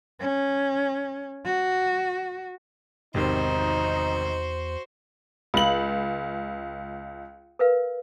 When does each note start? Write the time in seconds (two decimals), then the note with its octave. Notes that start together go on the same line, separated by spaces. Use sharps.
0.20 C#4
1.45 F#4
3.14 G#1 E2 C3 D#3 D#4 F#4 C5
5.54 C#2 F5 B5 F#7
7.59 A#4 B4 F5